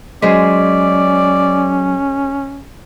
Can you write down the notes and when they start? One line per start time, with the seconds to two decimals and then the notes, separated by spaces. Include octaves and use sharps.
0.22 F#3 G#3 C#4 G#4 C5 D5 B6